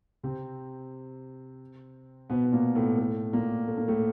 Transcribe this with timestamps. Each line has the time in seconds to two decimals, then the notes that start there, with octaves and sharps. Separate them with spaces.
0.24 C3 C4
2.30 B2 B3
2.44 B3
2.52 A#2 A#3
2.75 A2 A3
2.98 A2 A3
3.33 A#2 A#3
3.67 A3
3.78 A#3
3.88 A2 A3